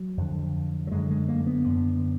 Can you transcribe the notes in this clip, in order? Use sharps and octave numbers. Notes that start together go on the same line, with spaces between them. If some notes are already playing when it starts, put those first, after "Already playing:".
Already playing: F#3
F2 D3
F#3
F#2 D3 G#3
G#3
A#3
B3
F#2 D3